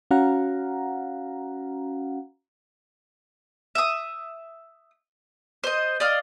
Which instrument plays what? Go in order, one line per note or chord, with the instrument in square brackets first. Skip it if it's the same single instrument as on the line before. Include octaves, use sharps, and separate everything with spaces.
[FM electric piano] C#4 F#4 F5 F#5 A#5
[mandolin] E5 D#6
C5 D#5
D5 D#5 F5